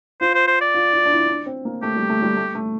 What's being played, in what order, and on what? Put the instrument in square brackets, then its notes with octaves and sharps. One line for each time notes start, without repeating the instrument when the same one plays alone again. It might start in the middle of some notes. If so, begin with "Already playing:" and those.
[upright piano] F4 [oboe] C5
[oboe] C5
C5
D5
[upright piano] F4
F4
D4
E4
D4
C4
A#3
[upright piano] A3 [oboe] G4
[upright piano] G3
A3
G3
A3
A3